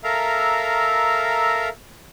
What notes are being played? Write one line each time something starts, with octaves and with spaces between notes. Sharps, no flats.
A4 A#4 E5 F5 A#5